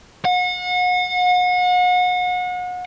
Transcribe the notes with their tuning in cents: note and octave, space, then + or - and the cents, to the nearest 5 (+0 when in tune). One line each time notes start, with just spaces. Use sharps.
F#5 -35